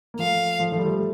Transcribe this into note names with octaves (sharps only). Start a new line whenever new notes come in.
A#3
F3 A3 F5
F3 A3
F3 A3
G3
F3 A3